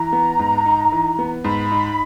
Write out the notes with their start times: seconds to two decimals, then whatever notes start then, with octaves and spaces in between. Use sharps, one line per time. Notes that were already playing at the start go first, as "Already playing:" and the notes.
Already playing: E3 A#5
0.13 B3
0.39 G#2
0.65 D#4
0.92 E3
1.19 B3
1.44 G#2 B5
1.72 D#4